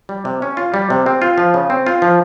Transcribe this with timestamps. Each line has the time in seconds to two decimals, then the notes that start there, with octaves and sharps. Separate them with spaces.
0.09 G3
0.25 C3
0.42 C#4
0.57 F4
0.74 G3
0.90 C3
1.06 C4
1.22 F4
1.38 F3
1.54 C#3
1.70 C4
1.86 F4
2.02 F3